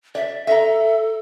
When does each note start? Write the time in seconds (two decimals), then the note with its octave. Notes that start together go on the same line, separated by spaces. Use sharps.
0.15 D5 E5
0.47 A4 E5 A#5